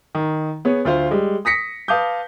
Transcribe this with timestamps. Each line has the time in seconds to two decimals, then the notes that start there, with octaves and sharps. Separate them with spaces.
0.15 D#3
0.65 B3 G#4 C#5
0.85 D2 F4 C5 F5
1.11 G3 G#3
1.45 D#6 A#6 B6 C#7
1.88 B4 F5 A5 D6 D#6 G6